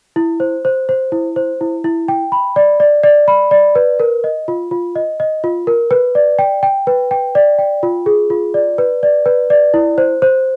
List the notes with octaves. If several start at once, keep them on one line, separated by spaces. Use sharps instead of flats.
E4
C5
C5
C5
E4
C5
E4
E4
G5
B5
D5
D5
D5
B5
D5
B4
A#4
D#5
F4
F4
D#5
D#5
F4
A#4
B4
D5
G5
G5
B4
G5
D5
G5
F4
G#4
F4
D5
B4
D5
B4
D5
E4
C5
C5